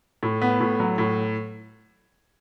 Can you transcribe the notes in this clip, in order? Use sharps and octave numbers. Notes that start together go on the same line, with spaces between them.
A2
B3
A2
F#3
A2